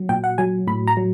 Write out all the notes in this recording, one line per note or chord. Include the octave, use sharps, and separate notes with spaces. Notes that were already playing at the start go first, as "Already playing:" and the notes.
Already playing: F#3
A#2 G5
F#5
F#3 G#5
A2 B5
A#5
F#3